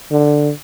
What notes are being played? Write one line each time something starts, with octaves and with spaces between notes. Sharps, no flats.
D3